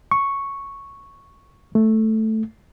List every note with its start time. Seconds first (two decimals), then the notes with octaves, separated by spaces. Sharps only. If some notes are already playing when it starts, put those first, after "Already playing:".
0.11 C#6
1.75 A3